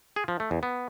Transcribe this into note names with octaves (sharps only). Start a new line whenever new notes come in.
G#4
F3
A3
E2
B3